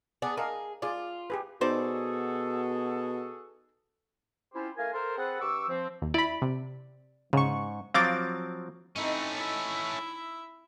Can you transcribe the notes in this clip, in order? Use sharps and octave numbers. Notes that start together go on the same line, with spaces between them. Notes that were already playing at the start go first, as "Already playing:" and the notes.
B3 G#4 D5 F#5
G#4 A#4 D#5 F5
F4 G#4 D5
G4 G#4 B4
B2 D#4 F#4 G#4 A4 C5 D5
C4 C#4 E4 F4 G4 C5
A3 A#4 F5 G#5
A4 A#4 C5
C4 G#4 A4 B4 F#5
G2 C#6 D6 E6
F3 C4
D#2
E4 D5 B5
C3
G#2 C#3 C#6
F3 F#3 C4 F5 D6 A6
A3 C4 C#4 D#4 E4
E4 E5